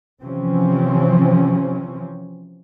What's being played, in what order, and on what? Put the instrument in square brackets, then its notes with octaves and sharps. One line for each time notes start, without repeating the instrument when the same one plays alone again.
[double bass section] C3 E3 F3 C4 C#4